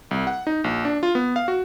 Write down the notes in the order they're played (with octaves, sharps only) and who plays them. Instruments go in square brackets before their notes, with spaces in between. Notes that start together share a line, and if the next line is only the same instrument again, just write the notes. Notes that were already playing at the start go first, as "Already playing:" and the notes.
[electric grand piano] C2
F#5
D#4
A#1
D4
F4
B3
F5
F#4